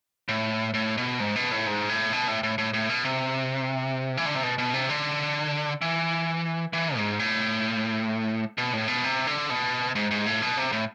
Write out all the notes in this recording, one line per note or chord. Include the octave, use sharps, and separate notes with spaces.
A2
A2
B2
G#2
B2
A2
G#2
A2
B2
A2
A2
A2
A2
B2
C3
E3
D3
C3
B2
B2
C3
D3
E3
E3
G#2
A2
B2
A2
B2
C3
D3
B2
G#2
G#2
A2
B2
C3
A2